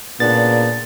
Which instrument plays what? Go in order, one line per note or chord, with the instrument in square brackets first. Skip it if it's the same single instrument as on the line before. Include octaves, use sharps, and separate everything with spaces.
[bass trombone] A#2 [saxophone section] C#3 B3 D4 [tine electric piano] A6